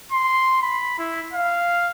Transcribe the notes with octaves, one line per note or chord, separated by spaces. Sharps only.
C6
B5
E4
F5